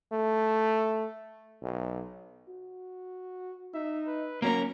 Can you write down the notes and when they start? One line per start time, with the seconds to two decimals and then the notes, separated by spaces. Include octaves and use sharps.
0.12 A3
1.62 B1
2.48 F#4
3.74 D#4 E5
4.07 B4
4.42 F#3 A#3 C#4 A#4 A#5